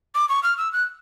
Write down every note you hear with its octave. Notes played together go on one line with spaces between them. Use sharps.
D6
C#6
F6
E6
F#6